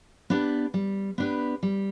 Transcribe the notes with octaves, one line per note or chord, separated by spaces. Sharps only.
B3 D4 G4 B4
G3
B3 D4 G4 B4
G3